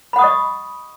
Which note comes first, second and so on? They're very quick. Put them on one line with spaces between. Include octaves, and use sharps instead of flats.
B5 F#5 D#6 C#6 D#5